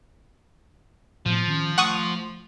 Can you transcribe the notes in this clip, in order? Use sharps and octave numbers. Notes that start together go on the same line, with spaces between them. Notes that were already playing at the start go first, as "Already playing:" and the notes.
A2 F3 B3
D#3 C#4
A3 F#5 C#6 D#6